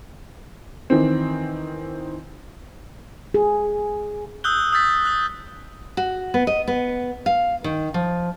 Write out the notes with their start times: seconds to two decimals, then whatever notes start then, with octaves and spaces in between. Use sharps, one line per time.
0.90 D#3 E3 C4
3.34 G#4
4.44 D#6 E6 F#6 G6 G7
4.72 D#6 E6 G6 A6 B6
5.05 D#6 F#6
5.97 F#4
6.34 B3
6.47 D#5
6.68 B3
7.26 F5
7.64 D#3
7.94 F3